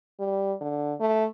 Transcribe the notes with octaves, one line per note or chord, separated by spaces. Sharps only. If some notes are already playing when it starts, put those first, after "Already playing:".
G3
D3
A3